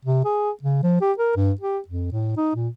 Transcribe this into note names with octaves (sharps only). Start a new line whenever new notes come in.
C3
G#4
C#3
F3
G4
A#4
G2
G4
F2
A2
D#4
A#2